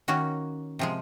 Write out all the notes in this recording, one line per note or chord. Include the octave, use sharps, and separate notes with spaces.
D#3 A#3 C#4 F#4
C3 F3 G#3